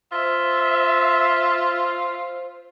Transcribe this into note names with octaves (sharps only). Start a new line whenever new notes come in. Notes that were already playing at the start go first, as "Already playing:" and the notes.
F4 C5 E5